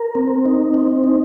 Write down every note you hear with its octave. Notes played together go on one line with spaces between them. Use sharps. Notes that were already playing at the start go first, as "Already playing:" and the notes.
Already playing: A#4
C4
D#4
C4
D#4